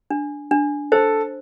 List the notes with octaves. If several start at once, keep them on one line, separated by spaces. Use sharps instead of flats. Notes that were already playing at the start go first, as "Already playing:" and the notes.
D4
D4
A4 C5